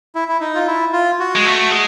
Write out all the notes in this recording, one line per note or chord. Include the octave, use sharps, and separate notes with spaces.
E4
E4
D#4
F4
E4
F4
F#4
G#3
A3
G#3